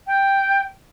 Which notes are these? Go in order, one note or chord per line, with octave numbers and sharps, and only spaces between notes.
G5